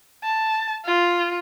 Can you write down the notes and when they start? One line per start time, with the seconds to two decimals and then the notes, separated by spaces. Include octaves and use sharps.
0.24 A5
0.85 F4